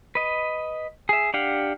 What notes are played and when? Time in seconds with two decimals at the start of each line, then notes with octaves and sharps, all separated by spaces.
0.15 B4 D#5
1.09 G#4 E5
1.34 D4 G4 F5 F#5